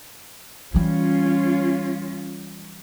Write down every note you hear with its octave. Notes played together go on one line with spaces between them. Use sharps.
E3 G3 C#4 F4